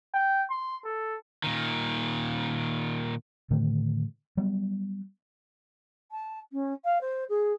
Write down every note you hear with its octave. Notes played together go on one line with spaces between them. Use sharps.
G5
C6
A4
A#2 D#3
A2 D3 D#3 A3
F#3 G3 B3
A5
C#4
F5
C5
G#4